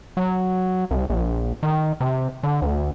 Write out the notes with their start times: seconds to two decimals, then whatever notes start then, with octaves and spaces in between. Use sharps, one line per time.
0.17 F#3
0.91 C2
1.10 A#1
1.63 D#3
2.00 C3
2.43 D3
2.62 D2